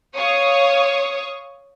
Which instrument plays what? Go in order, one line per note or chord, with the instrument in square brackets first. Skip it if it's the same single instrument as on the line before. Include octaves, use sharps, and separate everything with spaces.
[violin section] C#5 F5 C#6 D#6